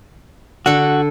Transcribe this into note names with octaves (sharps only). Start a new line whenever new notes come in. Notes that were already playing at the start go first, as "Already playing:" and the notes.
D3 F#4 A4